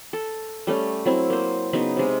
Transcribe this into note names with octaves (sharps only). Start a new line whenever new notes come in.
A4
G3 A3 C#4
F#3 C4 E4
A#3 C5
C#3 F#3 B3 D#4
C3 G#3